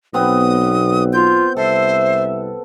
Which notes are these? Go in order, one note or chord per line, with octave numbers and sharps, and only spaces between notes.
B1 B3 C4 B4 D#6
F4 G6
C2 A4 C5 E5